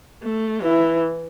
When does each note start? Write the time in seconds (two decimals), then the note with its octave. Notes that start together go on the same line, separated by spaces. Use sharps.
0.23 A3
0.62 E3 E4